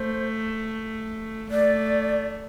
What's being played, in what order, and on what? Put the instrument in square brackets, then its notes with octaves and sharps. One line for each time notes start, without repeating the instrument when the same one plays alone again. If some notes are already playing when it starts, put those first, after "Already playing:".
Already playing: [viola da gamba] A3 [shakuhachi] C5
[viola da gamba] A3 [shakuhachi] D5